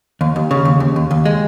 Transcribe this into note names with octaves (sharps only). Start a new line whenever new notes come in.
D#2
D#2
C#3
D#2
D#2
D#2
D#2
G#3